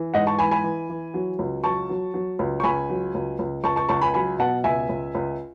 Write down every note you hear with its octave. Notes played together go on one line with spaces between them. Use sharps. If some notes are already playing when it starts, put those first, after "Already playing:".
Already playing: E3
G#2 D#5 F#5
A5 C#6
E3 G#5 B5
G#5 B5
E3
E3
F#3
C#2
F#3 A5 C#6
F#3
F#3
C#2
C#6
C#2 G#5 B5
F#3
C#2
C#2
C#2 A5 C#6
A5 C#6
C#2 A5 C#6
G#5 B5
F#3 G#5 B5
B2 F#5 A5
C#2 E5 G#5
C#2
C#2